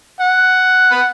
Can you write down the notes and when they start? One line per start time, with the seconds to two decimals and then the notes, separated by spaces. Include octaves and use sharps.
0.20 F#5
0.91 B5